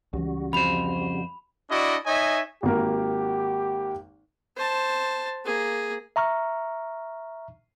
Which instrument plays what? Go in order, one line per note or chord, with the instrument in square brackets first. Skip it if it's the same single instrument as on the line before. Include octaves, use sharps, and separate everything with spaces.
[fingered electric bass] C#2 E3 [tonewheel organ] C#3 G3 F#4
[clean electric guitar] F2 C5 [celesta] B5 F7
[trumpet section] D4 E4 F#4 D5 D#5
D#4 C#5 D#5 E5 G#5
[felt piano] G#1 A#3 A#4 [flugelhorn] G4
[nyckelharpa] C5 A5
A#3 G#4
[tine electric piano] E5 A#5 C#6 F6